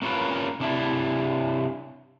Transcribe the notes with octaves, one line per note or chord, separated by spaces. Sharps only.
A#3 C#4 F4 A#4 B4
C3 D4 E4